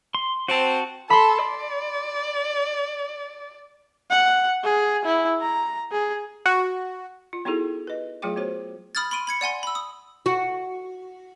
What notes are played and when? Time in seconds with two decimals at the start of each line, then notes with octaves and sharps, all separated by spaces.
0.15 C6
0.48 C4 F#4 A5
1.10 A4 B5 C6
1.45 D5
4.10 F#5
4.64 G#4
5.05 E4
5.41 A#5
5.92 G#4
6.46 F#4
7.33 F4
7.45 B3 D#4 E4 F#4 G#4 A4
7.87 B4 D#5
8.22 F#3 A3 F4 G#4 G5 D6
8.36 B3 F#4 C5 C#5
8.95 B5 D#6 F6 G#6 A6
9.11 B5 C6 D7 D#7
9.27 B5 G#6 C#7
9.41 D5 F#5 G#5 C6
9.63 B5 E6
9.75 D#6
10.26 F#4